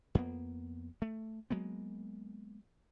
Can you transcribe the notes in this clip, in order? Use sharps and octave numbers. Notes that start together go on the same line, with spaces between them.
F2 A#3 B3
A3
F#3 G#3 A#3 B3